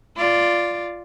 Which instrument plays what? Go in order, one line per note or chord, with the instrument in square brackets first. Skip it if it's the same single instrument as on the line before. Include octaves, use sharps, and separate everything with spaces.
[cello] F4 D5